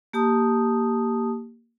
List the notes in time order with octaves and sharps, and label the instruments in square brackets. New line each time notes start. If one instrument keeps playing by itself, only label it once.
[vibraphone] A#3 G4 A5 D#6